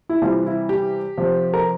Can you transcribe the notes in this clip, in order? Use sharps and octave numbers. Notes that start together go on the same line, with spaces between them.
E4
C3 E3 G3 F4
E4
G4
C3 F3
A#4